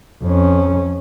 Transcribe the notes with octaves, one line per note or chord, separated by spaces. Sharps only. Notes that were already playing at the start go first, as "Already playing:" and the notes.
F2 C#4